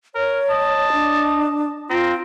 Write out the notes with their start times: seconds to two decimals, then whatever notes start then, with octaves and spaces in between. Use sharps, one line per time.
0.15 A#4 C#5
0.50 D#5 A5
0.93 D4
1.90 C4 F4 A#5